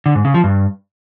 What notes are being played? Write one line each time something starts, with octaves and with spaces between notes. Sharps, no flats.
D3
G#2
C#3
F3
G2